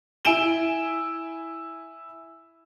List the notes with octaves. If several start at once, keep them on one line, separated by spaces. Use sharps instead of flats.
E4 E5 G#5 D7 E7 G7